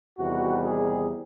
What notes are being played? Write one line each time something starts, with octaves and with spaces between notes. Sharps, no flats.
E2 C3 D#3 G3 F#4
G#4